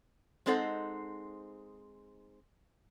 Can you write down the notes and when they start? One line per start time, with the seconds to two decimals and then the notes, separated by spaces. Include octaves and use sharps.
0.46 G#3 C4 D#4 A4 C5 F#5